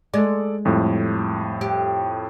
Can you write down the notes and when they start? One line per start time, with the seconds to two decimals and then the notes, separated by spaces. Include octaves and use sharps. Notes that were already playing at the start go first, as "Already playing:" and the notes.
0.14 G#3 A4 D5
0.65 F2 A2 G3
1.61 G4